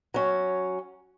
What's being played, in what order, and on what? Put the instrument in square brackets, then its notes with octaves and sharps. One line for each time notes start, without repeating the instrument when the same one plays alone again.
[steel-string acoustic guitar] F#3 C#4